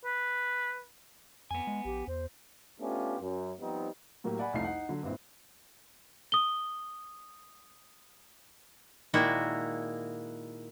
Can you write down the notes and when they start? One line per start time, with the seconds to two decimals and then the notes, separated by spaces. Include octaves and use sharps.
0.04 B4
1.51 F2 B3 G#5
1.67 G#3
1.85 A#1 G4
2.07 E2 C5
2.80 A3 B3 C#4 D4 F4 G4
3.21 F#2
3.60 F3 G3 B3 C4 D#4
4.24 A2 F#3 A#3 G4 A#4
4.39 D5 F#5 G#5 B5
4.53 C2 F2 A3 D#4 F5 C7
4.65 D#4 D#5 F#5
4.89 D3 F#3
5.03 G2 A#2 C4 E4
6.32 D#6 G7
9.14 A#2 D#3 G#3 A#3 E4 F#4